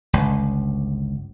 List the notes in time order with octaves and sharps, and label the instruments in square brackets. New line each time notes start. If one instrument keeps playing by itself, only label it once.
[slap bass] G1 C#2